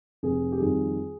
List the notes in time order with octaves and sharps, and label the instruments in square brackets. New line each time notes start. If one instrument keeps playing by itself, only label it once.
[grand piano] F1 G#4
G4
F2 D#3 G3 G#4